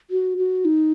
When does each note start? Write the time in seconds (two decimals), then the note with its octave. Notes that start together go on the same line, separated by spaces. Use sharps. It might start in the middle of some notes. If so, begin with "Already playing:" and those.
0.10 F#4
0.38 F#4
0.65 D#4